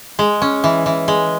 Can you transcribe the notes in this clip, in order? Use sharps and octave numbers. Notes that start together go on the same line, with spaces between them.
G#3
C#4
E3
E3
G#3